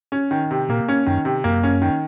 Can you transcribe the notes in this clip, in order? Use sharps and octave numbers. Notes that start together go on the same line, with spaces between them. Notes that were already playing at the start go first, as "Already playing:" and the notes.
C#4
D#3
C3
A#2 A#3
C#4
F#2 D#3
C3
F#2 A#3
C#4
D#3